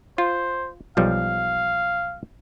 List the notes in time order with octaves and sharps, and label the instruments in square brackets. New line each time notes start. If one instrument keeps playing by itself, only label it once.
[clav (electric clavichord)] F4 [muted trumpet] C5
[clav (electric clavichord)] B1 F3 G3 [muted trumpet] F5